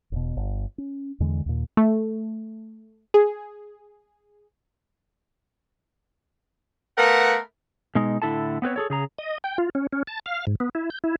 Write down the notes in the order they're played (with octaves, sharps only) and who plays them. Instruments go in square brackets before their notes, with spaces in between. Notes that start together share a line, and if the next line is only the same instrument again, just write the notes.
[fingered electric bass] E1 B2
G1
C#4
E2 D3 G#3
D#2 A#2
[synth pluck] A3
[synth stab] G#4
[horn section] A3 B3 A#4 F5 F#5
[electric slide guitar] B2 G#3 D#4
A2 D3 E4 A4 A5
B3 C4 B4 C#5
G#4 A4 C#5
C#3 G#4 A#5
[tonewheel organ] D#5
G5
F4
C#4
C#4
A5
F5
G#2
B3
E4
G6
E4